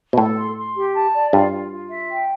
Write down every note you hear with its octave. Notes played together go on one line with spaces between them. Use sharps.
B2
A2 A4
C6
C6
G4
A5
D5
G2 F4
F4
F4
E5
G5